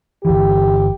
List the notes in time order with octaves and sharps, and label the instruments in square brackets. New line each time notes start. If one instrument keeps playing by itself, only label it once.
[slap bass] G1 E3 [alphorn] G4